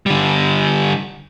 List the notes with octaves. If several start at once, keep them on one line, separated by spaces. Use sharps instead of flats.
D3 G3